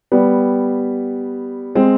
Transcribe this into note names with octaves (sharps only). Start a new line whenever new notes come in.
G3 B3
G#3 C4